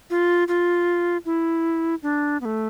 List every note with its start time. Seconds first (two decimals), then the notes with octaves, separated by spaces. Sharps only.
0.10 F4
0.48 F4
1.25 E4
2.03 D4
2.41 B3
2.45 A3